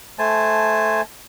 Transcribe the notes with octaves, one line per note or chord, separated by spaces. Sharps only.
A3 C5 G#5 A5